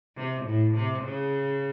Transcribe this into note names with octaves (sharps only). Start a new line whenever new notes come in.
C3
A2
C3
C#3